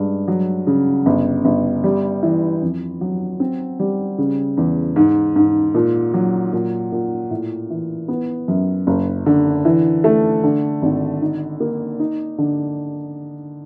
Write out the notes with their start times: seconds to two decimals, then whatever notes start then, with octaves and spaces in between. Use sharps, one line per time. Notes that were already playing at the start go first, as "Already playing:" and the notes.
Already playing: G2 G#3
0.28 F#3
0.67 C#3
1.06 G1
1.45 G1
1.84 G3
2.23 E3
2.62 F2
3.01 F#3
3.40 C4
3.80 G3
4.18 C#3
4.57 E2
4.96 G#2
5.36 G#2
5.74 A#2
6.14 F#3
6.53 A#2
6.92 A#2
7.31 A2
7.70 E3
8.08 B3
8.48 F#2
8.87 F#1
9.26 D3
9.65 E3
10.04 A3
10.43 D3
10.82 G#1
11.22 D#4
11.60 A#3
12.00 D#4
12.38 D3